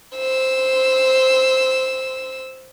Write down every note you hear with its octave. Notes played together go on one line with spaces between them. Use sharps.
C5 E6